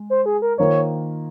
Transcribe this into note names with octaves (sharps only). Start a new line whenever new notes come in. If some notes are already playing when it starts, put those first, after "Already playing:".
Already playing: G#3
C5
G#4
A#4
D#3 A#3 F4 C5 C#5